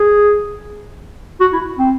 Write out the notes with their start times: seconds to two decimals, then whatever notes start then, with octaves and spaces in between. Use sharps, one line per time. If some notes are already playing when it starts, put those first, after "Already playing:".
Already playing: G#4
1.40 F#4
1.53 E4
1.78 C4